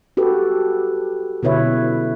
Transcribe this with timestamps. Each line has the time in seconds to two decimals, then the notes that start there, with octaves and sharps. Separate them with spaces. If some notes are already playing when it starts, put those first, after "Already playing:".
0.17 F#4 G4 A4 B4
1.43 B2 D3 E4 B4 C#5 E5